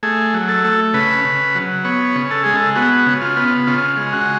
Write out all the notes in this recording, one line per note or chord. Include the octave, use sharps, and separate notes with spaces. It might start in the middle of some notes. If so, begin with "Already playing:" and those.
A3 G#4
F#3
A4
A3
C#3 B4
C#3
F#3
B3 C#5
C#3
A4
G#3 G#4
A4
B3 F#4
C#3
F4
B3
C#3 F4
G#3
F#4